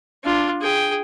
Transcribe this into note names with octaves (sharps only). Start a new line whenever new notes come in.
D4 F4
G#4 G5